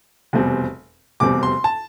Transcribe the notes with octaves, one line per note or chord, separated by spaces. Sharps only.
F1 E2 B2 G3 C4
F1 E2 B2 G3 C4 D6
C6
A5